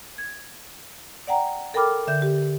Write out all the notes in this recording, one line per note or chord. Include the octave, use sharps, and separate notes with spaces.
G#6
D5 F#5 G5 A#5
A4 A#4 G5 B5 D6 F6
D3 E5 G6
G4